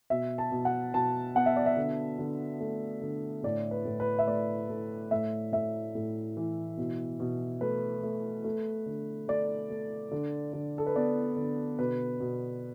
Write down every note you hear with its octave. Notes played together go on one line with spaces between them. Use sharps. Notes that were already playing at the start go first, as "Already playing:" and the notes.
B2 E5
A5
B2
F#5
B2 A5
B3 F#5
E5
D5
E5
D3
D3
A3
D3
A2 D5
B4
A2
B4
E5
A3 D5
A3
A2 E5
A2 E5
A2
E3
B2
B2
A3 B4
A3
A3
D3
A3 D5
A3
D3
D3
A4
B4
B3 D5
D3
B2 B4
B2